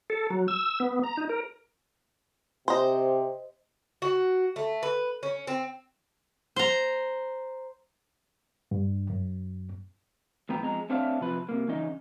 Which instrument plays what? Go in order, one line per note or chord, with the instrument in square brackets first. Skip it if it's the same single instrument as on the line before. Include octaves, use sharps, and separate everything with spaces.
[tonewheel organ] A4
F#3
E6
B3
A#5
D#4
A#4
[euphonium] C3 [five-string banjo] C5 D#5
[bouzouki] F#4
A3
B4
C#4
C4
[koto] C5 A#5
[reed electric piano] G2
F#2
[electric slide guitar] A2 E3 B3 G5 A#5
F2 G#3 A#5
A3 C4 D4 C#5 E5 F5
C3 F3 B4
C3 A#3
C#3 E3 C#4 D#4